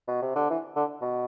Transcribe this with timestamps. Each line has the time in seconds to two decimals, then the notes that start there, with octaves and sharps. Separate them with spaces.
0.08 B2
0.22 C3
0.36 D3
0.50 E3
0.76 D3
1.02 B2